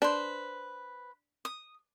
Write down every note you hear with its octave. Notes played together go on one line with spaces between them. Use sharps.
D4 B4 C5
D#6